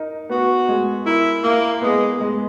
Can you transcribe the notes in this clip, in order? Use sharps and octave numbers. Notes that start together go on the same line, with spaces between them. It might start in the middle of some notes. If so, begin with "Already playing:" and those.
Already playing: D#4 A#4
B3 F#4
G#3
E4 A#4
A#3 E4
G#3 B3
G#3